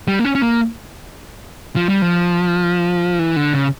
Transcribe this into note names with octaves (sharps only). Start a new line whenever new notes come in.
G3
A#3
C#4
C#4
A#3
F3
G3
F3
E3
D3
C#3